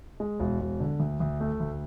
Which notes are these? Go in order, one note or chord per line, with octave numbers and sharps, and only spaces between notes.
G#3
E1
E1
D3
D2
D2
A3
D2